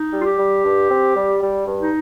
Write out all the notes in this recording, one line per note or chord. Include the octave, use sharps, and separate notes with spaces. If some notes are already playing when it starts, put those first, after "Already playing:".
Already playing: D#4
G3
F4
G4
G3
G2
C4
G3
G3
G2
D#4